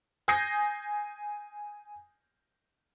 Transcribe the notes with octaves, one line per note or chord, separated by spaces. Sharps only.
G#5 D#6 G6 G#6 A#6 C7